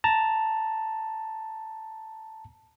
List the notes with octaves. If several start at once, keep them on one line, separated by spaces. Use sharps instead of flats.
A5 A#5